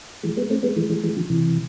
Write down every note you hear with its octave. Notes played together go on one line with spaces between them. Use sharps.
E3 G#3
G#3 B3
A3 C4
G#3 B3
E3 G#3
E3 G#3
E3 G#3
D3 F3
C3 E3